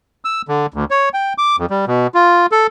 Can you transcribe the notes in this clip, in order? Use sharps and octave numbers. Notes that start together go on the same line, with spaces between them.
E6
D3
D2
C#5
G5
D6
F2
G3
B2
F4
A4